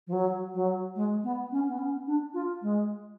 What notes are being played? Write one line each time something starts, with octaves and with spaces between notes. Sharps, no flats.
F3
F#3
F#3
G#3
B3
C#4
B3
C#4
D4
F4
G#3